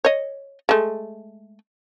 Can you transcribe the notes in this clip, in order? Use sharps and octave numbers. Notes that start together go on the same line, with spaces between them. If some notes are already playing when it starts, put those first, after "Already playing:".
C#5 D#5
G#3 A3